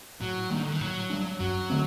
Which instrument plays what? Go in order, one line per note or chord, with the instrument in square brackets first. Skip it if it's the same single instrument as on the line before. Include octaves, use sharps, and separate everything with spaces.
[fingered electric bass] A2 [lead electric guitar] F#3
[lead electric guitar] D#3 [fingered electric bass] G3 A#3 D4
[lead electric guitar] D3
D#3
[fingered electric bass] A2 [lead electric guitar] F#3
[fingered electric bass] G3 A#3 D4
[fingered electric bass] F#2 [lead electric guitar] F#3
[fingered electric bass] D3 A3 C4